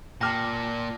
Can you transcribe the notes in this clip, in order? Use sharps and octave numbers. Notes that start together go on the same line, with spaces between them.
A#2 G5 A5 D6 F6 A#6